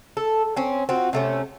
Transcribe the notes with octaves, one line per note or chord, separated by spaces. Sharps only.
A4
C4 C#4
C4 F4 F#4
C3 A3 C#4